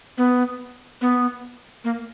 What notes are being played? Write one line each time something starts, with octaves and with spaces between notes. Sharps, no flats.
B3
B3
A#3